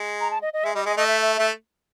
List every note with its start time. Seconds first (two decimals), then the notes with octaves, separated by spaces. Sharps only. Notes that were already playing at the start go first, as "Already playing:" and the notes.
Already playing: G#3
0.20 A#5
0.31 A5
0.42 D#5
0.53 D#5
0.64 G#3 E5
0.75 G3 D#5
0.85 G#3 D#5
0.97 A3 D#5
1.08 E5
1.22 E5
1.36 A3 E5